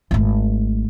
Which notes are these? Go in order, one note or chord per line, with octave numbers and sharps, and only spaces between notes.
G#1 A3